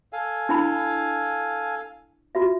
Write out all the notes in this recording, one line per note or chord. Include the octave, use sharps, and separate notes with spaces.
A4 F5 G#5
D4 E4 B5
F4 F#4 E5